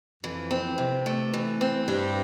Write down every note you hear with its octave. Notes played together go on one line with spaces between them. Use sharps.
F2 E3
C4
C3
A3
E3
C4
G2 G3